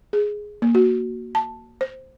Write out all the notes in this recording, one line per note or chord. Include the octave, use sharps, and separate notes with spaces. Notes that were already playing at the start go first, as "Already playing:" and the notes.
G#4
A#3
F#4
A5
C5